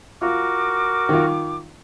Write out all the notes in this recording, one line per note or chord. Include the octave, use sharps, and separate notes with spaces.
F4 F#4 A#4 D6
D#3 F4